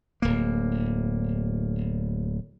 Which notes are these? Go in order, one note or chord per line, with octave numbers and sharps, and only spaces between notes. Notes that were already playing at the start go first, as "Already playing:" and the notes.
D1 A#3